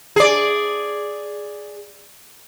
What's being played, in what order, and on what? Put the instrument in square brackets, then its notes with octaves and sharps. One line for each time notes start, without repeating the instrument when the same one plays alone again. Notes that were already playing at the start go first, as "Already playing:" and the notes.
[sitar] G#4 D5